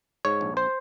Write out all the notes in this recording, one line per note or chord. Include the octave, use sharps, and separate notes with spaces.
G#2 C#5
A#1
C5